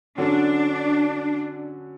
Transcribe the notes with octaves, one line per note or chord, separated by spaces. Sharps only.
D3 F#3 C#4 D4 F#4